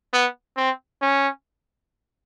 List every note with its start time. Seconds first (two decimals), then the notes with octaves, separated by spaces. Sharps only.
0.13 B3
0.57 C4
1.02 C#4